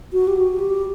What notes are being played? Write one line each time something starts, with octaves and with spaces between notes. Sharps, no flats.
F#4
G4
F#4
G4